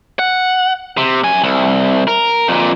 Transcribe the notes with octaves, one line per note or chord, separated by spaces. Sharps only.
F#5
C3
F#2 G#5
C2
A#4
F2 A#2